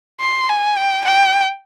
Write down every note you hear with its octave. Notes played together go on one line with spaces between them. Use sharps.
C6
G#5
G5
G5